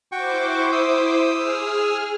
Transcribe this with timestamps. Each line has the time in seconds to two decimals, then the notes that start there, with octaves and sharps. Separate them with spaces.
0.12 E4 F#4 C5 G5 C#6 D6
0.72 D#6 E6
1.34 G#4 F6